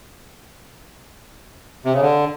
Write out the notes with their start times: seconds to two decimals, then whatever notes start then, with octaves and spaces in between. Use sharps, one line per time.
1.85 C3
1.93 C#3
2.02 D3